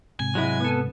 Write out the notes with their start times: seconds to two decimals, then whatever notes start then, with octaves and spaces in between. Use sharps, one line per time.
0.20 G#2 C3 G#5
0.35 F#3 G#3 E4
0.60 B3 A4